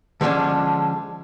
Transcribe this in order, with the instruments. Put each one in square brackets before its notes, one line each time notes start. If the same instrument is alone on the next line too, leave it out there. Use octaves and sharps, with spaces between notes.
[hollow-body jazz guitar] D3 F3 G#3 C#4 D4